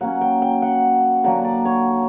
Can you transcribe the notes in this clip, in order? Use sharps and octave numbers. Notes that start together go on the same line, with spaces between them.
F#3 A#3 C#4 F#5
G5
G5
F#5
D3 F#3 A#3 F#5
D5
C#5